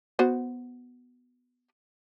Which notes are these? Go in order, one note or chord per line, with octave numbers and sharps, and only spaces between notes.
B3 F#4 C5